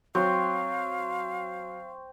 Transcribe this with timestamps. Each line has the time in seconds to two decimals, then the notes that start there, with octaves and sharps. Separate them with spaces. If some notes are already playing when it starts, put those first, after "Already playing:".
0.15 F#3 C4 F5 C#6